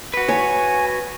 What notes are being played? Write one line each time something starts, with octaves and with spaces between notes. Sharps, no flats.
F#4 B4
C#5 G#5